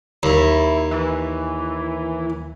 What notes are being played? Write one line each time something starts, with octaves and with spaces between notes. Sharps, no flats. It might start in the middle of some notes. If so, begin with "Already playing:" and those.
D#2 E4
E3